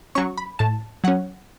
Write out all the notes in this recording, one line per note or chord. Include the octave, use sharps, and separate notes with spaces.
F#3 C#4 C#6
B5
A2 A5
F#3 C#4 F#5